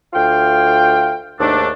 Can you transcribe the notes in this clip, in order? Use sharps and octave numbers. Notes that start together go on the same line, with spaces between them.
D2 F4 F5 G5
D#2 G#2 A3 D4